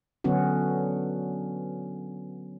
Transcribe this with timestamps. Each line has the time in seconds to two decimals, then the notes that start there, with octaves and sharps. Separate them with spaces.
0.24 D3 F#3 B3 C#4 F#4